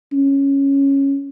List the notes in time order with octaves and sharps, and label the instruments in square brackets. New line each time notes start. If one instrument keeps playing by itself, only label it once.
[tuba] C#4